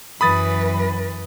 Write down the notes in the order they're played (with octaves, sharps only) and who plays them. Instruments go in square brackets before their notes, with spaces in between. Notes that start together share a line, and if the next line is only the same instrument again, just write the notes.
[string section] F#2 [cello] E3 B4 [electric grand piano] B5 D#6 A6